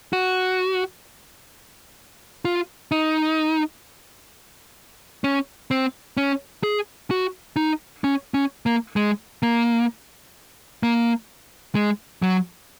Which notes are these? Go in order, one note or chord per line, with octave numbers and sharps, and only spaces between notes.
F#4
F4
D#4
C#4
C4
C#4
G#4
F#4
D#4
C#4
C#4
A#3
G#3
A#3
A#3
G#3
F#3